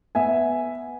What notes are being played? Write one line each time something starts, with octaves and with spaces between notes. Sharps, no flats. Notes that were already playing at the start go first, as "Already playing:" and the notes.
B3 E5 G#5